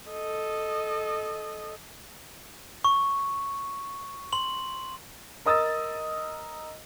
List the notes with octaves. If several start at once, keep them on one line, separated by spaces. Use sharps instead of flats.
A4 D#5
C#6
C6 F#7
A#4 D#5 D#6 E6 A6